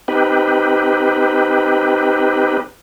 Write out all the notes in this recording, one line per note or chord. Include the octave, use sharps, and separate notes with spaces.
C4 D#4 G4 B4